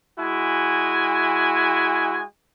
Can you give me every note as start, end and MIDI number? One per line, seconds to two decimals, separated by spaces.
0.19 2.22 56
0.19 2.22 64
0.19 2.22 66
0.19 2.22 80